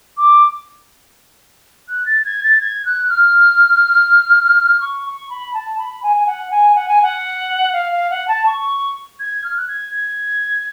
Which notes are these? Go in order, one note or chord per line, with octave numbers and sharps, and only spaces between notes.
D6
F#6
A6
G#6
A6
G#6
F#6
F6
C#6
C#6
B5
A5
B5
G#5
G#5
F#5
G#5
F#5
G#5
F#5
F5
F5
F#5
A5
C#6
G#6
F6
F#6
G#6
G#6